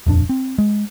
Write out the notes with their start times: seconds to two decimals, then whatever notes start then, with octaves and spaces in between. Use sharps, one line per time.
0.07 D#1 F2 D4
0.29 C4
0.58 G#3